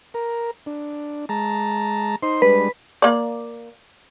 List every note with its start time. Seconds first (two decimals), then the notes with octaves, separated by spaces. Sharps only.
0.14 A#4
0.66 D4
1.29 G#3 A5 A#5
2.23 D#4 C5 C6
2.42 G3 G#3 D4 B4
3.02 A#3 D5